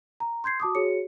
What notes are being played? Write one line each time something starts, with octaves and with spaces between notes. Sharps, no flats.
A#5
C6 G6 G#6 C7
F#4 A5 D6 D#6
F#4 G#4 C#5 C#7